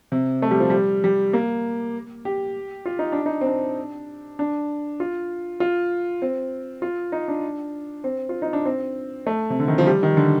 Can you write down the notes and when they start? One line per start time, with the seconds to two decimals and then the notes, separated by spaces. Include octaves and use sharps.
0.12 C3
0.42 A3
0.51 G3
0.60 F3
0.70 G3
1.04 G3
1.33 A#3
2.25 G4
2.85 F4
2.99 D#4
3.12 D4
3.26 D#4
3.41 C4
3.46 D4
4.39 D4
5.00 F4
5.60 F4
6.22 C4
6.82 F4
7.12 D#4
7.28 D4
8.04 C4
8.29 F4
8.42 D#4
8.53 D4
8.65 C4
9.27 A3
9.50 C3
9.60 D3
9.68 D#3
9.78 F3
9.87 G3
10.03 D#3
10.17 D3